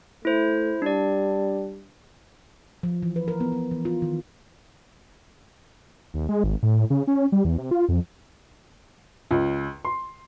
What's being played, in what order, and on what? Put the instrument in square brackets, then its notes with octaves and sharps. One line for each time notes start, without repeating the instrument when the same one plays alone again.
[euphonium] A3 [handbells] E4 C5
[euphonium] G3 [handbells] D4 D5
[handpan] F3
E3
B4
A#4
B3
B3
E3
F4
D#3
[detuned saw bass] D#2
G#3
G#1
A2
C#3
C#4
G3
E2
C3
F4
F2
[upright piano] C#2
C6